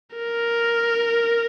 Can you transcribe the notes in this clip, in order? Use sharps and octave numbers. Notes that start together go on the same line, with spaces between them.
A#4